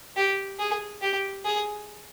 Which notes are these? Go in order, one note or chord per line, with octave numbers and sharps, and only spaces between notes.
G4
G#4
G4
G#4